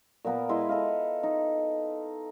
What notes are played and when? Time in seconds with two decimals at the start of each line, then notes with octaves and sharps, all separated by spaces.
0.25 A#2 A#3 B3 A#4
0.49 G#3 E4 B4 C6
0.69 A4 D#5 F5
1.23 D#4